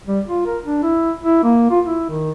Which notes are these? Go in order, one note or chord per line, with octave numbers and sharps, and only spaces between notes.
G3
F4
A#4
D4
E4
E4
A#3
F4
E4
D#3